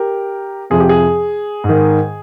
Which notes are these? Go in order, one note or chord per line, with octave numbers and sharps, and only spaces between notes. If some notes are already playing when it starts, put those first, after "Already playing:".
Already playing: G4 A#4
F2 C3 F3 G#4
G4
G#4
G#2
D#3